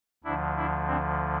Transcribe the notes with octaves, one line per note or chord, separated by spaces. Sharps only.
D2 D3 F3 D4 E4
D4 E4
C4 D4